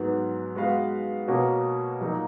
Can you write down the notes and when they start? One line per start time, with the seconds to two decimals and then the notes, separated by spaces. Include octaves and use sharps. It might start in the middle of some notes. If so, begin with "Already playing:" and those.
Already playing: G#2 F#3 B3
0.55 G#3 B3 F#4 B4 F5
1.28 B2 A#3 C#4 F#4
2.01 A#2 F#3 A#3 D#4 F#4